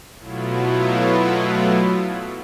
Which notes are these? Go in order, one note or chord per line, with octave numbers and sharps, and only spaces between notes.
B2 F#3 A3 B3 E4 F4